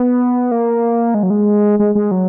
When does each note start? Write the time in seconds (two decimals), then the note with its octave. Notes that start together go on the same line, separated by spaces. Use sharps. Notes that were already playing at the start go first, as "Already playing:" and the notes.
Already playing: B3
0.52 A#3
1.14 G#3
1.23 F#3
1.30 G#3
1.79 G#3
1.95 G#3
2.11 F#3